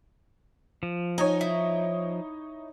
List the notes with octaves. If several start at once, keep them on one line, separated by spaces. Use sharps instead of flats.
F3
D#4 C#5 G#5
E4